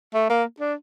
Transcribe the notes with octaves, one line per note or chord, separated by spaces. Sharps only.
A3
A#3
D4